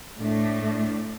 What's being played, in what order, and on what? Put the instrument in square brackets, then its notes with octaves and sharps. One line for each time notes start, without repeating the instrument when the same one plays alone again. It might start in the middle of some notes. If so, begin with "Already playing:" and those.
[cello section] A2 A3 D4